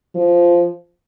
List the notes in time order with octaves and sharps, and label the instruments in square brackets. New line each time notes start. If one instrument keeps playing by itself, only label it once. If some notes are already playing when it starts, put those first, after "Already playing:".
[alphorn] F3